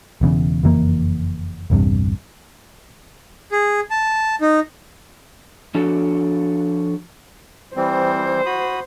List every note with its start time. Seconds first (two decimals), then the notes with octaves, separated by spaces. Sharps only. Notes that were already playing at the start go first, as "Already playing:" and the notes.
0.21 E1 E2 C#3
0.63 F#1 F2 E3 A#3
1.70 A#1 E2 G2 C3
3.52 G#4
3.90 A5
4.41 D#4
5.75 F3 D4 F#4 A4 C#5
7.76 E3 G3 C4 C5
8.46 F#4 B5 D#6